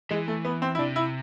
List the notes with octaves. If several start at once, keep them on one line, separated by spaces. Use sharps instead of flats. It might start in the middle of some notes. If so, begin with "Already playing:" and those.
E3 G#3
A3
B3
C4
E4
C3 D4
E4